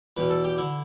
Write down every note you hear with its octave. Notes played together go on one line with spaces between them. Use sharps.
E2 B2 B4
A4
G4
D3 E4